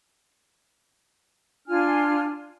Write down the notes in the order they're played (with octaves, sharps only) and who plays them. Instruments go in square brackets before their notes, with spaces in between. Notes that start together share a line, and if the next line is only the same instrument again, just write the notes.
[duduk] D4 [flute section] F4 G#5 F6